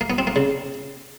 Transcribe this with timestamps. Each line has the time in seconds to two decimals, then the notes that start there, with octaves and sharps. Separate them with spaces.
0.01 A#3
0.10 B3
0.18 C4
0.27 A#3
0.36 C#3